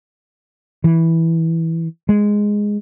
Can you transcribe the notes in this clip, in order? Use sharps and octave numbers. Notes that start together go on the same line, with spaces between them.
E3
G#3